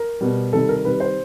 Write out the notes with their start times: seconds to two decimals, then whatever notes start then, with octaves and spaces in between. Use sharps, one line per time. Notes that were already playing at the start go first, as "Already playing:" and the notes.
Already playing: A#4
0.21 B2 G3
0.53 C3 D#3 G3 A4
0.69 A#4
0.85 C3 D#3 G3 B4
1.00 C5